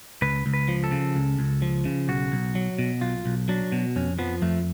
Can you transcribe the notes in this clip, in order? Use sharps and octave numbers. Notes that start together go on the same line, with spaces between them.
C#2 B4
C#2
B4
F3
A4
C#3
C#2
C#2
F3
C#3
B1 F#4
B1
F#3
B2
B1 F4
B1
F#3 D4
B2
F2 C#4
F3 B3
F2 A3